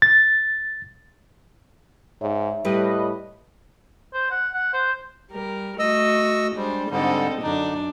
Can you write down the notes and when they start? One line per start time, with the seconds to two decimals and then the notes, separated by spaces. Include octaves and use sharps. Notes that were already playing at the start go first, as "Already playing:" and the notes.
0.02 A6
2.21 G#2 C#5 E5
2.65 A2 G3 B4 D#5
4.14 C5
4.31 F#5
4.54 F#5
4.73 C5
5.31 G3 A#4
5.79 A3 F#4 D#5 E6
6.56 G3 G#3 D4 C5
6.90 G#2 D3 G3 C4 A4 D#5
7.43 F#2 D3 D4 D#4